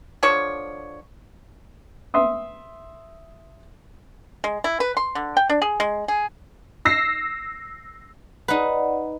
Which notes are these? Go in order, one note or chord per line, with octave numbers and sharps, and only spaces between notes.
D3 F3 C#5
E5 C6 D#6
G#3
E4
B4
C6
D3
G5
D4
G#4
G#3
G#4
E6 A#6 C7
D#4 B4 D5 F#5